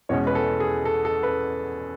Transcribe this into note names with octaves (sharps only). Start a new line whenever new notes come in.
E2 B2 G#3 C#4 C#5
B4
A4
G#4
A4
A4
B4